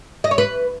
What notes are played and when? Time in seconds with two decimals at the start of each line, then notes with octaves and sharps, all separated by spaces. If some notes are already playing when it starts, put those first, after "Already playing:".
0.24 D#5
0.31 C#5
0.38 B4